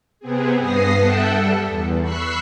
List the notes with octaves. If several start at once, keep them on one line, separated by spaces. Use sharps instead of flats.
C3 B3 C4 G#4
G2 B3 D#6 A#6 C7
A4 E5 F#5 G5 A5
G3 A4
E2
B5 C#6 E6 F#6 B6 C7